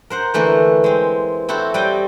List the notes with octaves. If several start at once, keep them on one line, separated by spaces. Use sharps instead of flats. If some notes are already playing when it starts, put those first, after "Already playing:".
A#4 C5 F#5
D3 E3 A3 A#3
G#3 C4
C4 E4 F#4 A4
G3 C4 F#4 D#5 G5